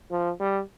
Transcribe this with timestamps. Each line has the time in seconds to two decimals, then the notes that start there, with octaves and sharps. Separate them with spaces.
0.11 F3
0.40 G3